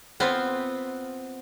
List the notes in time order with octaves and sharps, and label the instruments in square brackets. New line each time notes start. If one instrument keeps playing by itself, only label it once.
[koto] B3 C4 F4